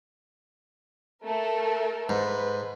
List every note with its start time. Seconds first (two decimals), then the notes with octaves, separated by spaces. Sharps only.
1.25 A3 A4 A#4
2.09 G#2 B4